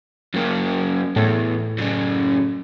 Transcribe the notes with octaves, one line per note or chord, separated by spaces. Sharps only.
F#2 A#3
E2 A2
F#2 C#3